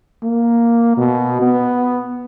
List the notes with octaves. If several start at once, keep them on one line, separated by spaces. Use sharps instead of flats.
A#3
B2
B3